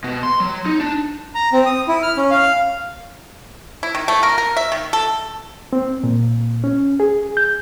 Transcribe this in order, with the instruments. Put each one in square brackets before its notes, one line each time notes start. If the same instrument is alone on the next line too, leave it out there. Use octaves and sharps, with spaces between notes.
[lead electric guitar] B2
C6
F#3
D#4
D4
[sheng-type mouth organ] A#5
C4
D#6
E4
F6
C#4
F5
[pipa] E4
D#3
A3
A#4
A#4
E5
D#3
A4
[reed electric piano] C4
A#2
C#4
G#4
G6